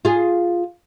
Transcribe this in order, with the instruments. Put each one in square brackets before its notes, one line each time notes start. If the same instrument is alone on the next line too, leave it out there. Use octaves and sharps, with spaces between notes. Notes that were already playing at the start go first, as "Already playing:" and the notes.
[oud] F4 G#4